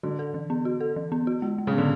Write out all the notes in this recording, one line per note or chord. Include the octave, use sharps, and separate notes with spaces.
D3 F#4
A4
E3
B3
F#4
A4
E3
B3
F#4
G#3
G#3
C#3
D3 B3